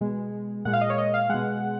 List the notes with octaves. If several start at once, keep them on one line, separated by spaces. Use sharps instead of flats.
B2 G#3
A#2 G#3 F#5
F5
D#5
C#5
D#5
F5
B2 G#3 F#5